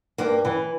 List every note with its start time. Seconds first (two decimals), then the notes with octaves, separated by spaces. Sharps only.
0.18 G2 A#3
0.45 E3